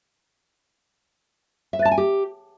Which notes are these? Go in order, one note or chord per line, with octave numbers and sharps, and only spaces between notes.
E5
B4
A5
G#5
G4